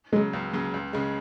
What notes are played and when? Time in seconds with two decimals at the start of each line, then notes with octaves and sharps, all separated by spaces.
0.12 C#3 F#3 G#3
0.33 C#2
0.53 C#3 F#3
0.74 C#2
0.93 C#3 G#3